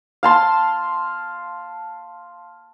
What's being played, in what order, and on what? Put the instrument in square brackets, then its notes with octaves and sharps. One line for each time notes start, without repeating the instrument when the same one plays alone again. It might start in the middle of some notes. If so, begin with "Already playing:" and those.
[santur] F5 A5 C6